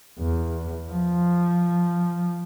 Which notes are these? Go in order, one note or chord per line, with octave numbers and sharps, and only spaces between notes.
E2
F3